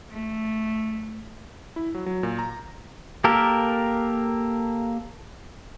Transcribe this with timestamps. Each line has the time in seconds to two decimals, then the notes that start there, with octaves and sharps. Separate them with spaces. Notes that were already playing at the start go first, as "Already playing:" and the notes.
0.11 A3
1.76 E4
1.94 F#3
2.06 F#3
2.23 A#2
2.39 A#5
3.24 A#3 G4 A4 A#4